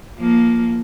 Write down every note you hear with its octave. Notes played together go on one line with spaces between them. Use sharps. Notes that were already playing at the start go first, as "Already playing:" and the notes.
F3 A#3